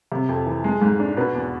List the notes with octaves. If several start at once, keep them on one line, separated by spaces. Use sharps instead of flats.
C3
F2
E3
G#3
G#2
D4
B2 B4
E2